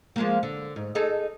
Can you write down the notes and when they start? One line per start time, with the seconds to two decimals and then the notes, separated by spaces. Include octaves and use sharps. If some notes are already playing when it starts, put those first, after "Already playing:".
0.16 F3 G#3 A#3
0.43 D3
0.76 G#2
0.95 D#4 G#4 A4